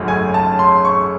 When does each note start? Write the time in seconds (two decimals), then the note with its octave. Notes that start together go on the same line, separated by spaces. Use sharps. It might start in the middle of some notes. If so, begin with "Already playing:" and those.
Already playing: G#1 F#2 C#3 F#3 A3
0.08 G#5
0.34 A5
0.59 C6
0.85 C#6